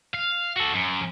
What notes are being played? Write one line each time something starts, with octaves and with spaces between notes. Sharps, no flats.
F5
F#4 A4
F#2